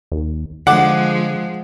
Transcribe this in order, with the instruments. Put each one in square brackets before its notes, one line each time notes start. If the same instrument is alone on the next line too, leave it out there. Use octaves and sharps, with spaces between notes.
[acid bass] D#2
[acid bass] D3 [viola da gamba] F3 G#3 [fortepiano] F#5 D6